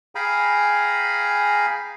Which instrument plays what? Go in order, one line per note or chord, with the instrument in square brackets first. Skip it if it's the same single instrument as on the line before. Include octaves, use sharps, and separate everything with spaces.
[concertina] G#4 F5 G5 G#5 A#5 B5